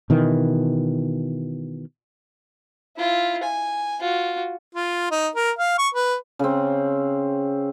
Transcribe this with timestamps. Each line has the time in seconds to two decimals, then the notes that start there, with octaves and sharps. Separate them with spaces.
0.10 B2 D#3 E3
2.97 E4 F4
3.43 G#5
4.00 F4 F#4
4.75 F4
5.11 D#4
5.36 A#4
5.59 F5
5.78 C#6
5.95 B4
6.39 C#3 C4